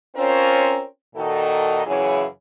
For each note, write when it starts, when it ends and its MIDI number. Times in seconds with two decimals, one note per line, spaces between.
0.17 0.83 60
0.17 0.83 61
0.17 0.83 65
0.17 0.83 70
0.17 0.83 72
0.17 0.83 73
1.16 1.82 46
1.16 1.82 51
1.16 1.82 63
1.16 1.82 66
1.16 1.82 69
1.87 2.26 42
1.87 2.26 49
1.87 2.26 52
1.87 2.26 64
1.87 2.26 68
1.87 2.26 73